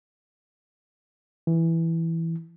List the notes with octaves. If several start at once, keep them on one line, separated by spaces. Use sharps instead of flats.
E3